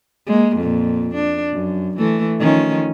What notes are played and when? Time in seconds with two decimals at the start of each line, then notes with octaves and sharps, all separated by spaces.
0.27 G#3 A#3
0.57 F2 A#2
1.14 D4
1.52 F#2
1.98 E3 A3
2.40 D#3 F3 C#4